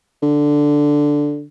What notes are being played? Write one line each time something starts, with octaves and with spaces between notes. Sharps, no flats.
D3